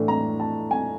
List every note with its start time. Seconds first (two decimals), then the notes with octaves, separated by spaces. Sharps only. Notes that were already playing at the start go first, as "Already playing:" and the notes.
Already playing: A2 E3 A3 D4
0.08 A#5
0.40 A5
0.71 G#5